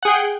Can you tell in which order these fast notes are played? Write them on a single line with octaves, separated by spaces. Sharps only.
F#5 G#4 G5